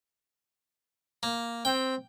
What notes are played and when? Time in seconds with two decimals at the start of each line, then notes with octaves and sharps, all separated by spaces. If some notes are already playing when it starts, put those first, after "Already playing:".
1.23 A#3
1.65 C4 G5